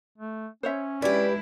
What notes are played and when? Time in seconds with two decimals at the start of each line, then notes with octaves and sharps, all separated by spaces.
0.18 A3
0.63 C#4 C5 C#5 E5
1.02 G#3 D4 E4 G4 B4 D5